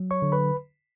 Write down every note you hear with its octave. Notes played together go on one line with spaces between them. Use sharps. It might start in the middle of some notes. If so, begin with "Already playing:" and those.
Already playing: F#3
C#5 C#6
D3
B4 B5